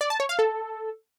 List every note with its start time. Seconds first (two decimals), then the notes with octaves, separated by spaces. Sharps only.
0.01 D5
0.10 A5
0.20 C#5
0.29 F5
0.39 A4